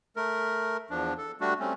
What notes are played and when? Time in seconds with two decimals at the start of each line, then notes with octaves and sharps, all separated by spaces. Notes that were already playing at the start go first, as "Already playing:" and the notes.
0.16 A3 A#4
0.90 E2 F3 D4
1.18 A4
1.41 G3 A3 D4 F#4
1.59 G3 A3 C4 C#4